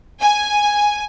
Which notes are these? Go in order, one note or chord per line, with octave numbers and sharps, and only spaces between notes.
G#5